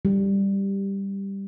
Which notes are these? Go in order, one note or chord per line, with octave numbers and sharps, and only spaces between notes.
G3